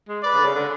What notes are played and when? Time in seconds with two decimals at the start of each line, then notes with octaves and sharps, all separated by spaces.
0.09 G#3
0.23 B4 D5
0.34 C#3
0.39 D3
0.45 C#3
0.55 D3